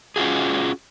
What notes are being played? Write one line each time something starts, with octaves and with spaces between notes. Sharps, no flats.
C#4 F4 F#4 G#4